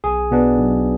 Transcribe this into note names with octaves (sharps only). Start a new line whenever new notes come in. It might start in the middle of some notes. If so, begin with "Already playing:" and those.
B1 G#4
B2 B3 D4
B1